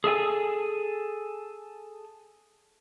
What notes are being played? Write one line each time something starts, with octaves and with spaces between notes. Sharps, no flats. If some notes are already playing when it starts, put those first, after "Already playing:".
G#4 A4 E5 G#5